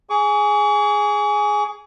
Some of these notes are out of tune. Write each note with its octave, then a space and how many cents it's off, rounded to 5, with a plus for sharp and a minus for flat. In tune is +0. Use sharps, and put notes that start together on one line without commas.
G#4 +0 C#6 +45